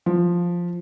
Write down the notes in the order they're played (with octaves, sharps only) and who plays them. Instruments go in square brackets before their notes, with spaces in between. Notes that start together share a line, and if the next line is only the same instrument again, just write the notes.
[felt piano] F3